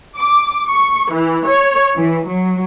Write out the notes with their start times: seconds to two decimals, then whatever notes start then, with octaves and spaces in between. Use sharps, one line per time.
0.17 D6
0.67 C#6
1.12 E3
1.47 C#5
1.97 E3
2.28 F#3